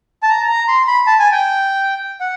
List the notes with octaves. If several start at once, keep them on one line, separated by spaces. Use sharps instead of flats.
A5
A#5
A#5
C6
B5
A5
G#5
G5
F#5